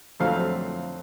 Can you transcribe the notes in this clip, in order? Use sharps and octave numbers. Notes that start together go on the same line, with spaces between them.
F2 D3 F#3 A3 C4 F5